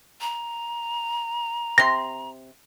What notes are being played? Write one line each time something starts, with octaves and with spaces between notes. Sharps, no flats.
A#5
C3 C6 A#6